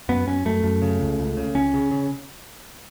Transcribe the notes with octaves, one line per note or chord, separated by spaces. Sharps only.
F#2 B3
F#2 C#4
F#2 A3
F#2
C#3
C#2
C#2
C#3
C#2 C#4
C#3
C#3